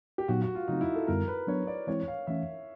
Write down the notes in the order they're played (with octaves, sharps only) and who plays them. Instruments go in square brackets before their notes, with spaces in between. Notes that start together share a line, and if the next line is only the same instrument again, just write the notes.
[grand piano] G4
[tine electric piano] A#2 F#3 B3 D#4 [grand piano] F#4
[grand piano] F#4
F4
[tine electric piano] C#3 F#3 A3 C4 [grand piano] D#4
[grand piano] E4
A4
[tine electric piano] F#2 D3 G3 B3 E4 [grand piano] A#4
[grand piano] B4
[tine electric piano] F#3 B3 D4 [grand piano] C#5
[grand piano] D5
[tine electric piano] E3 G#3 C4 E4 [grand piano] C#5
[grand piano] F5
[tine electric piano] E3 A3 C#4 [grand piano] E5